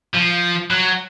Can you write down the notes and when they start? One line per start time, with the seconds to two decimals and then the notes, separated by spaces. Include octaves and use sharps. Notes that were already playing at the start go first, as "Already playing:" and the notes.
0.14 F3
0.70 F#3